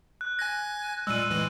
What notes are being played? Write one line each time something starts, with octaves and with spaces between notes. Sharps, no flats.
F#6
G#5 F#6 G#6 A#6
A#2 G3 G#3 E6 D#7
A2 E3 G#3